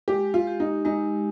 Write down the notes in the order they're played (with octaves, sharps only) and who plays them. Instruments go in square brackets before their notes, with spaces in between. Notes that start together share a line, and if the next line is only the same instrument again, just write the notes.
[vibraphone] G#3 [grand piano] G4
[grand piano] F4
[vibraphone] G4
[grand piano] D#4
[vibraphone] G#3 [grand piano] D#4